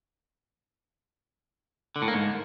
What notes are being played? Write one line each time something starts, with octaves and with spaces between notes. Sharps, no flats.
D3
A2
A#3
G#2